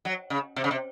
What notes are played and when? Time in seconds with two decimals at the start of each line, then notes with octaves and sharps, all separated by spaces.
0.05 F#3
0.30 C#3
0.56 C3
0.64 C#3
0.71 C3